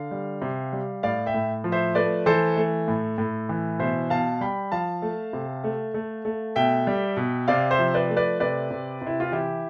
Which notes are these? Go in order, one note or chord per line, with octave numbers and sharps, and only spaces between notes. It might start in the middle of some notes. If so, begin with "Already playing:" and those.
Already playing: D3 F5
G3
C3
G3
A2 D5 F5
E5 G5
A2
F3
C5 E5
A3 B4 D5
E3 A4 C5
A3
A2
A2
E3
B2 C5 E5
B2 F5 A5
G3 G5 B5
F3 F5 A5
A3
C3
A3
A3
A3
B2 E5 G5
G3
B2
C3 D5 F5
C5 E5
F3
B4 D5
A3
B4 D5
C3 B4 D5
C3
C3 E4
F4
E3 E4 G4